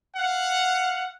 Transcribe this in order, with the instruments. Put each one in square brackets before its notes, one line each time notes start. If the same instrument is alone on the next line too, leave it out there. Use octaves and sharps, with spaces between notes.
[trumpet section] F5 F#5